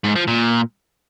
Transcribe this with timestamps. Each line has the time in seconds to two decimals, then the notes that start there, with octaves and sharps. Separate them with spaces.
0.04 G#2
0.16 F3
0.27 A#2